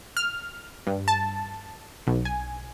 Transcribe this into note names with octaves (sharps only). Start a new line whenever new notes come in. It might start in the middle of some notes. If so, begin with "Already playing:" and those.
F6
G2
A5
B1
G#5